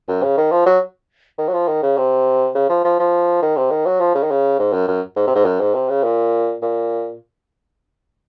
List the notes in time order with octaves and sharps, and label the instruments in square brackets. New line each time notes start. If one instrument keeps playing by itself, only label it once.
[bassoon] F#2
C#3
D#3
F3
F#3
D#3
F#3
F3
D#3
C#3
C3
C#3
F3
F3
F3
D#3
C3
D#3
F#3
F3
C#3
D#3
C#3
G#2
F#2
F#2
G#2
C3
G#2
F#2
G#2
C3
C#3
A#2
A#2